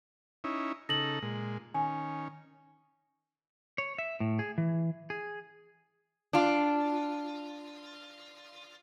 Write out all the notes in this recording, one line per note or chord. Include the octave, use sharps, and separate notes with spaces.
C#4 D#4 E4
C#3 D#4 A4 A#6 F#7
A#2 G#3
D#3 C#4 G#5
C#5
E5
A2
G#4
E3
G#4
D4 F4